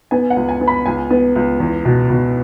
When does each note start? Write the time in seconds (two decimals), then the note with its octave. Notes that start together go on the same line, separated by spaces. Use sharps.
0.11 B3 G#5
0.30 F#5
0.36 C#2
0.49 G#5
0.61 B3
0.68 B5
0.86 C#2 G#5
1.10 B3
1.36 C#2
1.60 E2
1.85 B2
2.10 B2